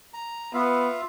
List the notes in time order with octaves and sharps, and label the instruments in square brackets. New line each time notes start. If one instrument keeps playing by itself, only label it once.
[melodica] A#5
[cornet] B3 [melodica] F4 E5 F5